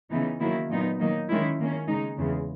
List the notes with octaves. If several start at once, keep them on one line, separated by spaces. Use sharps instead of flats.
C#3 E3 B3 D#4
D#3 F#3 A#3 E4
A#2 F#3 B3 D#4
D#3 F#3 A#3 D#4
D#3 G#3 C#4 E4
D#3 A#3 C#4
C#3 G#3 D#4
E2 C#3 G#3